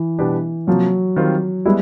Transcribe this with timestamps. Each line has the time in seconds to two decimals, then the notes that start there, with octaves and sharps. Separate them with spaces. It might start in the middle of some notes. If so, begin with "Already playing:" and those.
Already playing: E3
0.18 B2 G3 B3 D4 G4
0.67 C3 F3 F#3 A#3
1.16 D#3 G3 C4 F4
1.65 G3 G#3 B3 E4